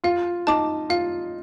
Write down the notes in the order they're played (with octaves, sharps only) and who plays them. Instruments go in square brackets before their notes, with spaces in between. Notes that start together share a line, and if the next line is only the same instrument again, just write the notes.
[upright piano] F4 [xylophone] F5
[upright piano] D#4 [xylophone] A5 D6
[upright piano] F4 [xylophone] F5